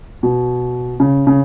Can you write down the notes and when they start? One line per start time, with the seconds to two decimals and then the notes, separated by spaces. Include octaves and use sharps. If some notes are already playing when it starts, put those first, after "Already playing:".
0.23 B2
1.00 C#3
1.27 C#3